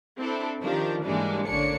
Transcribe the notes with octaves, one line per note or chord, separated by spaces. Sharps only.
C4 D4 E4 A4
D#3 F3 D4 G4 A#4
G#2 E3 G3 G#3 A#3 D4
A1 D3 A#3 D4 C#5 C#7